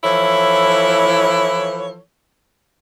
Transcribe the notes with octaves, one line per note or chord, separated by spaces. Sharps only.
E3 F3 E4 A4 C#5